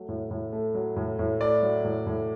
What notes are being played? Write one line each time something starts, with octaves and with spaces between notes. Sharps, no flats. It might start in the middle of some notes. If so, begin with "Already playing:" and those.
Already playing: F#3 A3
A2
A2
A3
F#3
A2
A2
A3 D5
F#3
A2
A2